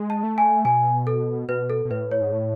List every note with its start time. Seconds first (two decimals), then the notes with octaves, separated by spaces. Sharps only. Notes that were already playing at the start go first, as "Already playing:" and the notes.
Already playing: G#3
0.10 A5
0.23 A3
0.38 G#5
0.65 B2 G#5
1.07 A4
1.49 B2 B4
1.70 A4
1.85 B2
1.91 A2 B4
2.11 C#5
2.21 G#2
2.32 A2